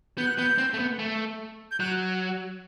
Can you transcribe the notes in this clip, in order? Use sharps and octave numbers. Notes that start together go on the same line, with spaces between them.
B3 G6
F#6
B3 G6
C4
A3
B3
A3
G6
F#3 F#6